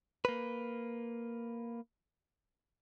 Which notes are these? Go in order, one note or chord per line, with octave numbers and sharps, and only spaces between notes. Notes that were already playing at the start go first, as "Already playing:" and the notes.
A#3 B4